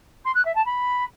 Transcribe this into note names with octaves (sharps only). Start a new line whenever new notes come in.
C6
F#6
E5
A5
B5